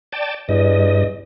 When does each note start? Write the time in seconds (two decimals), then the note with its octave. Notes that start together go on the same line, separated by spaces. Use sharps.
0.12 D5 G5 A5
0.49 E2 G2 D#5